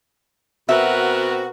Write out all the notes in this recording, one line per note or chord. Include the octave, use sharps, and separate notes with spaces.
B2 C4 F#4 A#4 B4 E5